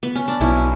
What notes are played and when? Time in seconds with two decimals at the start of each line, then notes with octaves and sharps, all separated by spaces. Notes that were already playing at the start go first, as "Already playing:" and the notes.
0.03 B3
0.15 C#4
0.28 D4
0.41 B1 C#4 E4